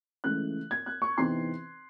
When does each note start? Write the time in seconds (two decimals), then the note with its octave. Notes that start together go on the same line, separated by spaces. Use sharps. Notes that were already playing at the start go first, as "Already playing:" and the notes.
0.24 C#2 C#3 E3 A3 F#6
0.71 G#6
0.86 F#6
1.02 C#6
1.18 E2 C3 E3 C4 D#4 C6